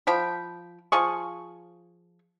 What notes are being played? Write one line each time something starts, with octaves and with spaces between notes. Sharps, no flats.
F3 G5 B5
F3 F4 G#4 C#6